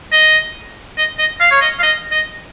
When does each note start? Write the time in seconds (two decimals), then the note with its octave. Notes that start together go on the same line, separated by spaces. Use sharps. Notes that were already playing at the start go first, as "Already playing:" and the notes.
0.12 D#5
0.98 D#5
1.18 D#5
1.41 F5
1.51 C#5
1.61 D#5
1.79 F5
1.83 D#5
2.11 D#5